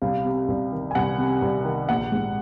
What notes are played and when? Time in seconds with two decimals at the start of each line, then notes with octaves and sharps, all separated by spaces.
0.02 C2 F5
0.25 C3
0.48 C2
0.72 D#3
0.91 G#5
0.95 C2 F#5
1.18 C3
1.42 C2
1.65 D#3
1.89 A#1 F#5
2.12 G#2